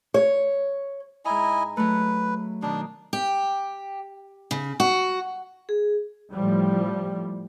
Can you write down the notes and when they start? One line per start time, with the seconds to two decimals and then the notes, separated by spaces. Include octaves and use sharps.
0.14 C#5
1.25 G#2 E4 D#5 G#5 A#5
1.77 F#3 A3 B4
2.62 B2 D#3 D4
3.13 G4
4.51 C#3
4.80 F#4
5.69 G#4
6.33 A2 F3 G3